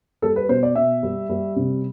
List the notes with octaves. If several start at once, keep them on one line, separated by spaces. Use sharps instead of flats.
G3 A4
B4
B2 C5
D5
B2 E5
G3
G3
C3